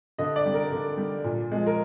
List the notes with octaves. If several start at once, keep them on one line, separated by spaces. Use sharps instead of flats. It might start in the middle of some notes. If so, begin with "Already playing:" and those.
D3 D#5
D5
G3
A#4
D3
G3
A#2
F3 G#3
A#4